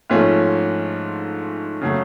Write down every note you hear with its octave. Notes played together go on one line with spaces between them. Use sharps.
G#2 F3 A3 C#4 F4
C#3 F#3 A3